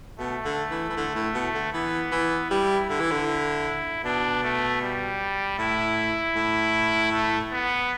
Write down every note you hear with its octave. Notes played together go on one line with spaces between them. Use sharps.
B2 A3
D3
E3
E3
D3
A2
B2
D3
E3 B3
E3
G3 E4
D3 E4
E3
D3
E4
B2 D4
A3
G3
A2 E4
A2
A3
B3